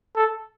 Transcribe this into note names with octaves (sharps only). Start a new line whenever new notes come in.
A4